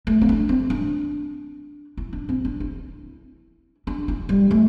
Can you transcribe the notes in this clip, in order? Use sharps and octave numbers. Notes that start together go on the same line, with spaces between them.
A3
C4
D4
C4
D4
E4
D4
C4
D4
E4
D4
E4
G3
A3